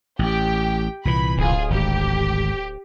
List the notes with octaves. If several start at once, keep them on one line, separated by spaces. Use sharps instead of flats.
A1 G4 G5
C2 A#2 E3 B5
D1 F4 G#4
G#1 D2 G4